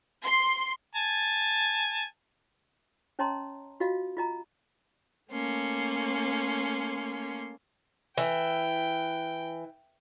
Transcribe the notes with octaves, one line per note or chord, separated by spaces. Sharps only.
C6
G#5 A5
C#4 C#5 D#5 A5 A#5 C6
F4 F#4 D#5 F5
F4 D#5 A#5
A3 A#3 C#4 C6
E3 G5